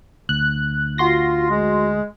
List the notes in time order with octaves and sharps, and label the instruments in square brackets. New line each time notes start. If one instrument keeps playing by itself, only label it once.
[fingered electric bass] D2 [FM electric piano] F#6
[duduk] F4 [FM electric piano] F#4 C6 A#6
[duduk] G#3